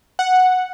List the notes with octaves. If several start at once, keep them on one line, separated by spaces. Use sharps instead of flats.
F#5